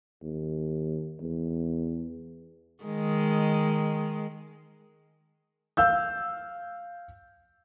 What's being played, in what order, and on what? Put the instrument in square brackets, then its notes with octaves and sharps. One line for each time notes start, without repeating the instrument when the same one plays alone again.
[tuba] D#2
E2
[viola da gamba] D#3 G#3
[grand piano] F5 E6 G6